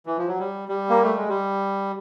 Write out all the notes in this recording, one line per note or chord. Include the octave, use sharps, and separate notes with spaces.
E3
F3
F#3
G3
G3
A#3
A3
G#3
G3